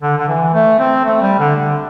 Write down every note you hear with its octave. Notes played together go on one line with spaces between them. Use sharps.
D3
D3
E3
A3
C4
A3
G3
D3
D3